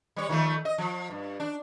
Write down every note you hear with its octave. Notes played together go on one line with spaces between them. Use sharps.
G3 C#5
D#3 F3 A3
D#5
F3
G2
D4